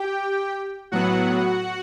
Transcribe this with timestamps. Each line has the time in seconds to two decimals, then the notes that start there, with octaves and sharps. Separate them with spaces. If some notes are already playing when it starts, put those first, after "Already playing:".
Already playing: G4 G5
0.92 A2 F#3 B3 F#4 F#5